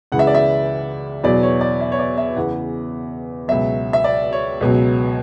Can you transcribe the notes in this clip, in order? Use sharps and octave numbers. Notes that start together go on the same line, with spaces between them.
C#2 C#3 E3 F#5
E5
D5
E5
E2 B2 F#3 D5
C#5
D5
E5
C#5
D5
E5
E2 C#3 E3 F#5
C#2 B2 F#3 E5
E5
D5
C#5
C#2 B2 F#3